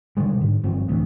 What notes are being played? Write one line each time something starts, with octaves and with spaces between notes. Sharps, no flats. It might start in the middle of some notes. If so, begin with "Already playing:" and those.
B2 D3 G3 G#3
G#2 D3
G1 F3 C4
A1 D2